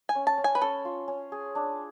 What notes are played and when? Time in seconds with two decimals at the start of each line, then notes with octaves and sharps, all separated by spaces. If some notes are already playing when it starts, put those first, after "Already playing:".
0.09 G#5
0.15 C#4
0.27 A5
0.38 C#4
0.44 G#5
0.55 B4
0.62 C#4 A4
0.85 F4
1.08 C#4
1.32 G#4
1.55 D4